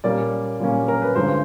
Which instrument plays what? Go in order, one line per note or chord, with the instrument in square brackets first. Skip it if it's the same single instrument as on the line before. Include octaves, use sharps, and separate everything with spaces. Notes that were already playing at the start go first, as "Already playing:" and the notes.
[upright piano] A#2 G3 A#3 C#4 D5
A#2 G3 A#3 C#4
A#4
B4
G2 D3 F3 G#3 C5